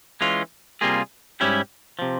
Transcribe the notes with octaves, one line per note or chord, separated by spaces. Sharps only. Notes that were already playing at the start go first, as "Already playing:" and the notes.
E3 G#3 C#4 F4
C3 G3 A#3 F4 G#4
G#2 G3 C#4 E4 G4
C3 F3